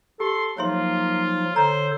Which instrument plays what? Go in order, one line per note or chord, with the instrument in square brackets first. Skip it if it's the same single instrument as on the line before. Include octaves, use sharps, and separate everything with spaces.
[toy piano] G4 [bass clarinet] A4 [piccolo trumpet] C6
[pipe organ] F3 F#3 D#4 [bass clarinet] A#3 [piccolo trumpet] F4 [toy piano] C#5 E5 C6
[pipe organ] D3 A4 C#5 [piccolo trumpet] C5 [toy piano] A#5